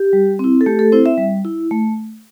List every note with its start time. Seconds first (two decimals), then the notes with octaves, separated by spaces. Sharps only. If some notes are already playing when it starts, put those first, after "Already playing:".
Already playing: G4
0.13 G3
0.39 C4 E4
0.61 A4
0.66 A3 G4
0.79 A4
0.92 C4 E4 C5
1.06 E5
1.18 G3
1.45 E4
1.71 A3